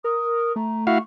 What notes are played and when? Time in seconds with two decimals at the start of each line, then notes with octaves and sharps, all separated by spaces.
0.04 A#4 D#6
0.56 A3 A#5
0.87 E4 F#4 F5 C#6